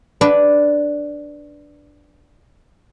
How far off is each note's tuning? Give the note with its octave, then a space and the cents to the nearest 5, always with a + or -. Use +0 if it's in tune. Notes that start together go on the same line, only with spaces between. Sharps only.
D4 +0 B4 +5